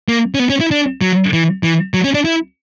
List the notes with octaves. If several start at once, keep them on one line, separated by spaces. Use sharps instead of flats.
A#3
C#4
B3
C#4
E4
D4
F#3
E3
E3
F#3
C#4
D4
E4